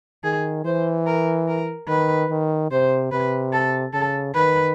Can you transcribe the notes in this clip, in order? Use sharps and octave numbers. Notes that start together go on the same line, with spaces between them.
D#3 G#4
E3 C5
A#4
A#4
D#3 B4
D#3
C3 C5
C3 B4
A4
C#3 A4
D#3 B4